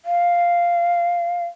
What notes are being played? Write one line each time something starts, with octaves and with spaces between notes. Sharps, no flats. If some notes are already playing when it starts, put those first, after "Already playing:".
F5